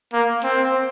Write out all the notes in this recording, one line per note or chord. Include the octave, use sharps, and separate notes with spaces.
A#3
C4